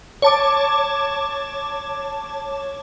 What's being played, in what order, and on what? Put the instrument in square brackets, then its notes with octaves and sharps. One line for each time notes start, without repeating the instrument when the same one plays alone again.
[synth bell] C#5 A5 D6